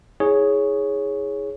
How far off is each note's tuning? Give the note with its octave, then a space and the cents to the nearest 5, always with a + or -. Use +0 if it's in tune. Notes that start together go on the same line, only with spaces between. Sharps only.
E4 -35 G#4 +0 C#5 +0